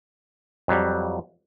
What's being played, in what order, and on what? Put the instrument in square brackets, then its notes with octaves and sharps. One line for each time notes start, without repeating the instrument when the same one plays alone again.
[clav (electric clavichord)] F2 F#3 G3